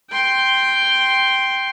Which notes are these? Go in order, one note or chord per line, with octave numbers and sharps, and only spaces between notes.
G5 C6